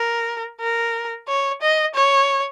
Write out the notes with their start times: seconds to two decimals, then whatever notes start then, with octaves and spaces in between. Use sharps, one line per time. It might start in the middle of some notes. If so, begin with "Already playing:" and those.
Already playing: A#4
0.60 A#4
1.28 C#5
1.62 D#5
1.95 C#5